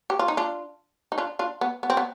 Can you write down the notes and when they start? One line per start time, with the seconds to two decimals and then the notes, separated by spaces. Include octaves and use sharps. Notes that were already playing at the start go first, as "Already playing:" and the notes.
0.10 G4
0.19 F4
0.28 D#4
0.37 D4 F4
1.12 D#4
1.18 D4 F4
1.39 D4 F4
1.61 B3
1.83 B3
1.90 C4
1.97 B3